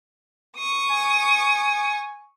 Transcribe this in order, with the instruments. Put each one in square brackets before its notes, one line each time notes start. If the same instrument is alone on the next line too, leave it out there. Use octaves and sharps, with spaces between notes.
[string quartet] C#6 D#6
[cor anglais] G#5